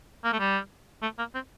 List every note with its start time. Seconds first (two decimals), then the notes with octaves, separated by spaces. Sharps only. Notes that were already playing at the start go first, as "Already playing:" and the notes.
0.24 A#3
0.33 A3
0.39 G3
1.02 A3
1.18 A#3
1.34 C4